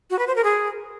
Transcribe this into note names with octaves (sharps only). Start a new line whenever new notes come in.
F#4
B4
C5
A#4
G#4